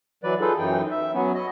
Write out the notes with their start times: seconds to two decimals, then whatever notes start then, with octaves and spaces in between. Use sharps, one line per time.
0.24 E3 F#3 B4 D5
0.41 D#4 F4 G#4 A4 B4
0.58 F#2 E3 D#4 G5
0.91 E5
1.14 F#3 B3 C#4
1.35 F#4 D#5